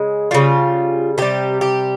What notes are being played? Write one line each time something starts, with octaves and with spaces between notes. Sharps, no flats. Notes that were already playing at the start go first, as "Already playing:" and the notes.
Already playing: C#3 G#3
C#3 G3 F4
C3 G3 G4
G4